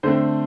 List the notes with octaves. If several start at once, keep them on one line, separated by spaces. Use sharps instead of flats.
D3 A3 C4 C5